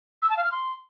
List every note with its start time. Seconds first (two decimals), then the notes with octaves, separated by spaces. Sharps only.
0.22 E6
0.30 A5
0.37 F5
0.44 F6
0.52 C6